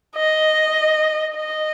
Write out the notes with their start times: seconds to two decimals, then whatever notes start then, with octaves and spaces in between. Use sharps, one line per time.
0.17 D#5
1.36 D#5